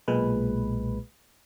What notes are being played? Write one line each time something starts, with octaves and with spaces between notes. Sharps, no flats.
B1 A#2 G#3 B4